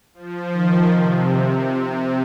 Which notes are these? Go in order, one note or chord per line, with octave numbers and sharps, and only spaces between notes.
F3
D#3
C3